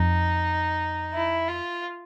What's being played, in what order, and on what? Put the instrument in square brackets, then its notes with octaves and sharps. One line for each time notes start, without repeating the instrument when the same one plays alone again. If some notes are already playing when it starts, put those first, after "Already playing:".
Already playing: [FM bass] F2 [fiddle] D#4
[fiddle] E4
F4